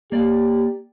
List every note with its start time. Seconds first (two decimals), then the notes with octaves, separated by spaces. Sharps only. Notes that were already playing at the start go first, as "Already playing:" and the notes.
0.12 A#3 G4 D5